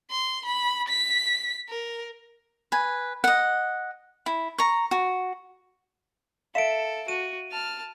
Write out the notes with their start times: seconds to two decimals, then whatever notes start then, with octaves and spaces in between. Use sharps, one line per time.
0.11 C6
0.45 B5
0.89 B6
1.69 A#4
2.72 B4 G#5
3.24 D#5 F#5
4.26 E4
4.58 A#5 C#6
4.91 F#4
6.55 A4 E5 F5 D7 E7
7.08 F#4 D#7
7.52 A5 F6